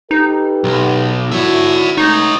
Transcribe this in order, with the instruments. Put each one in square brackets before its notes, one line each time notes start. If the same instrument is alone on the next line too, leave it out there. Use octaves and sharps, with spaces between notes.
[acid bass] D#4 [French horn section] G4 A4 B4
[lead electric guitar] B1
[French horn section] D3 E4 F#4 [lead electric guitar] C#5 E5
[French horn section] G#3 A3 [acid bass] D#4 [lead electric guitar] C#5 D#5